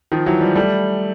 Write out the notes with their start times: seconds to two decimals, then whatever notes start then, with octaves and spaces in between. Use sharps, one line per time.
0.12 D#3 F3
0.26 E3 F#3
0.41 F3 G3
0.56 G3 A3